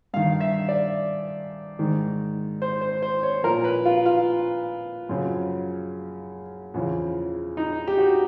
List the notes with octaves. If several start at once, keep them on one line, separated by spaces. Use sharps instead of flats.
G2 D#3 F5
E5
D5
G#2 D#3
C5
C5
C5
C#5
A#2 F3 A#4
B4
F4
F4
F#2 C#3 F3
E2 C#3 F3
D#4
G4
F#4